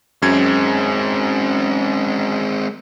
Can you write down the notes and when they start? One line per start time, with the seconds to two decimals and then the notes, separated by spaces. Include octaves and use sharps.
0.22 F#2 G#3 C4 G#6